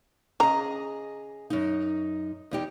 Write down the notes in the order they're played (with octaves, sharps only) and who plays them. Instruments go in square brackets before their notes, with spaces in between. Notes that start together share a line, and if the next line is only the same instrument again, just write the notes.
[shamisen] C#3 A#5 [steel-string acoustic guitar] G#4 D#5
[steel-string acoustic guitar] F#2 D#4
E2 D#4 G4